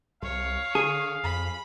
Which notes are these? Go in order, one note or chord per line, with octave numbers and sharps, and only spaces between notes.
C2 C#5 F5
D3 G#4
F2 B5